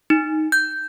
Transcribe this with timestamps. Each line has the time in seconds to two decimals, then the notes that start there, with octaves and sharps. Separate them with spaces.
0.10 D#4
0.52 G6